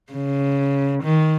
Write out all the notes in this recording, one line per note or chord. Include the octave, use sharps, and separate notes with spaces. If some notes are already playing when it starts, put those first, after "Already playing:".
C#3
D#3